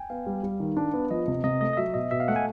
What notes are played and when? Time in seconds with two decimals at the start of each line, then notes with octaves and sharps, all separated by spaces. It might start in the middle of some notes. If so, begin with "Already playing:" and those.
Already playing: G5 G#5
0.10 B3 F5
0.26 G3
0.43 G3
0.60 D#3
0.77 D4
0.94 B3
1.11 F3 D#5
1.28 C3
1.44 C3 D#5
1.61 A3 D#5
1.73 D#5
1.77 F#3 E5
1.94 B2 D#5
2.11 B2 E5
2.20 F5
2.28 A3 F#5
2.36 G#5